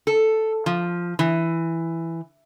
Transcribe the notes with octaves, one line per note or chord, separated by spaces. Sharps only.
A4
F3
E3